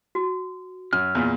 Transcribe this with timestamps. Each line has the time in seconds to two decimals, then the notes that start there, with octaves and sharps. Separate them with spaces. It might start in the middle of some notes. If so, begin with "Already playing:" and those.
0.15 F#4
0.93 F#2 F6
1.15 E2 A#2